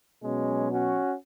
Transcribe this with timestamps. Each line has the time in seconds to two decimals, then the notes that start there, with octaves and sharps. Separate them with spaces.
0.22 B2 F#3 G#3 C#4
0.70 C#4 F#4